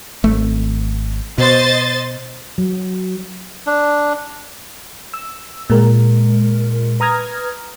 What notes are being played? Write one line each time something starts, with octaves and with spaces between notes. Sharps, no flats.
G#1 A3
B2 C5 D#5 A6
F#3
D4
E6
A#2 G#3 A#4
B4 A#5 D#6 F6 G#6 A#6